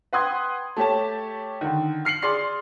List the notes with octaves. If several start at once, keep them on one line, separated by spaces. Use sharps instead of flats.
B4 F#5 G5 C6 D#6 G#6
A3 G4 C#5 A5
D3 D#3
F6 C7 C#7 F#7
G#4 D5 C6 C7